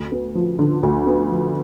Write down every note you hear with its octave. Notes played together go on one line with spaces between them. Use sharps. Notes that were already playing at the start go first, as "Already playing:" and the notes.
Already playing: D2
B3
F3
D3
D2
B3
F3